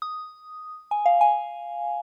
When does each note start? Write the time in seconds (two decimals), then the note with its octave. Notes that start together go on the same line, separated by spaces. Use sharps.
0.02 D#6
0.91 G#5
1.06 F5
1.21 G#5